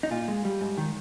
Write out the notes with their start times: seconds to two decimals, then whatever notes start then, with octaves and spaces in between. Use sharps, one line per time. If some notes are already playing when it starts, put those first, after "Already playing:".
0.03 D#4
0.11 A#2 F4
0.28 G#3
0.45 G3
0.61 G#2
0.77 D#3